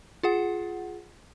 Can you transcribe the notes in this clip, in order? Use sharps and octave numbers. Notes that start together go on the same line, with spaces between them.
F4 G#4 F#5